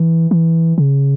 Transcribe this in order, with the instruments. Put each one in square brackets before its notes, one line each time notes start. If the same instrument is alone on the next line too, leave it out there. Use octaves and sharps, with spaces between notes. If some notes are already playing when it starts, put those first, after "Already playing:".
Already playing: [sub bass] E3
E3
C#3